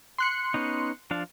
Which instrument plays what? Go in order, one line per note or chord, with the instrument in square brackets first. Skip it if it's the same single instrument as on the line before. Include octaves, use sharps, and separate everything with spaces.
[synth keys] C6 F#6 C#7
[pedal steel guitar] B3 C#4 D#4
F3 D4 F5